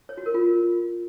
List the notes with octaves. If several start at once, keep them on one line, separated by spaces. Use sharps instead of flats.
C#5
F#4
A#4
F4